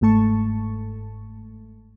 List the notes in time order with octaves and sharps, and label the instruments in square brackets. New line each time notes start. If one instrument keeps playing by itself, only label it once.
[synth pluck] G1 G#2 A3 A5 C#6